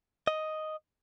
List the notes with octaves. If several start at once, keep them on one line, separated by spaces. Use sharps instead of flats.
D#5